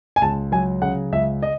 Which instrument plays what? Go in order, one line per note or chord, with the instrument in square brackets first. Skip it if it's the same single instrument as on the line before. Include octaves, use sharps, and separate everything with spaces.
[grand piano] G#5
C#2 A5
F#3 G#5
C#3 F#5
C#2 E5
D#5